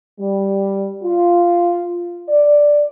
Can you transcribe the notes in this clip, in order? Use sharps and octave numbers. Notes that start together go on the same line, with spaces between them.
G3
F4
D5